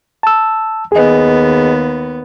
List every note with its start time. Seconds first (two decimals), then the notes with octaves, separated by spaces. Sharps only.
0.23 A5 E6
0.92 D#2 B3 G#4 D#5